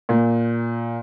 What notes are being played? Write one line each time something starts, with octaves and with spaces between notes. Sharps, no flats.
A#2